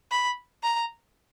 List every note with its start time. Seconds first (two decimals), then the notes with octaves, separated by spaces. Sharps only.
0.11 B5
0.63 A#5